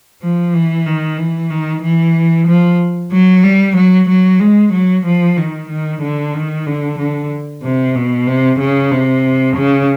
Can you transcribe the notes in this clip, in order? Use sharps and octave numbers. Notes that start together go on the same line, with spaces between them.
F3
E3
D#3
E3
D#3
E3
F3
F#3
G3
F#3
F#3
G#3
F#3
F3
D#3
D#3
D3
D#3
D3
D3
C3
B2
C3
C#3
C3
C#3